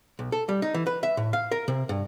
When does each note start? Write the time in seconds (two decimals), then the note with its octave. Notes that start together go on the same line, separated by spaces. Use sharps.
0.19 B1
0.32 A4
0.49 G3
0.62 D#4
0.74 E3
0.87 B4
1.03 E5
1.17 A2
1.33 F5
1.51 A#4
1.68 C3
1.89 G2